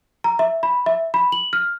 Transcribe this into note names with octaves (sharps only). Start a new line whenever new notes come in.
A#5
E5
B5
E5
B5
F#7
F6